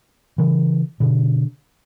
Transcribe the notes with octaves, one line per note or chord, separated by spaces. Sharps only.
C#3 E3
B2 D3